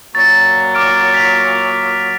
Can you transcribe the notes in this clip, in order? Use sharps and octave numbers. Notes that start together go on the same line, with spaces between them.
A#2 F#3 A6
D6 F6 D7
B6 F7